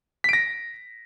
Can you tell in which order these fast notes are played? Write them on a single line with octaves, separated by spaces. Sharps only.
B6 D7 A#6